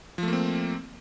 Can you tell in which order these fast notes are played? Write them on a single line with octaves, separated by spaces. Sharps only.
F3 A3 A#3 C4